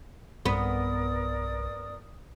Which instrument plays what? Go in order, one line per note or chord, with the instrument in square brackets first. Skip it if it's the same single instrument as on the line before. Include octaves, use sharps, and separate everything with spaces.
[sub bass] B1 [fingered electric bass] G2 C4 [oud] B3 [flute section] A#4 D5 D#6